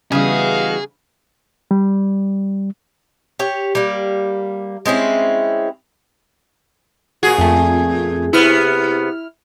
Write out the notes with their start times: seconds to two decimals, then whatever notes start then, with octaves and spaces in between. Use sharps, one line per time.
0.12 C#3 E3 G3 B3 F#4 G#4 D#5 F5
1.71 G3
3.39 G4 C#5
3.75 G3 A#3
4.86 G#3 C4 C#4 E4
7.23 A#2 F#4 G#4
7.38 F2 A3
8.33 C3 B3 E4 F6